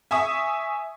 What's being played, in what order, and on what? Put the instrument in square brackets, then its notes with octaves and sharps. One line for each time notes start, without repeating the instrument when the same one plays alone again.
[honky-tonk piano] E5 G#5 C#6 D#6